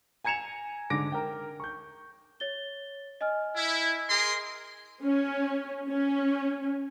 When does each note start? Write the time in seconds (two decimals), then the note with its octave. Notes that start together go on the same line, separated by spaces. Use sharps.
0.24 G#5 A#5 G#6 C#7 E7 F7
0.90 G#2 D3 D6 A#6 D7
1.12 A#4 G5
1.60 C#6 G6
2.40 C#5 A6 G7
3.21 D#5 G#5 F6
3.57 E4
4.09 G#4 A#4 C6
5.03 C#4
5.88 C#4